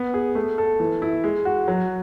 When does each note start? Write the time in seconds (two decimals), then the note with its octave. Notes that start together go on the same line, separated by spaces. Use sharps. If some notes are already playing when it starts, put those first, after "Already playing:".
Already playing: B3
0.14 G#4
0.35 A3
0.58 A4
0.80 E3
1.02 E4
1.24 G#3
1.45 F#4
1.68 F#3